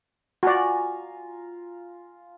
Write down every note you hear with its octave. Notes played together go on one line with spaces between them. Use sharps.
F4 F#4 D5 G#5 A#5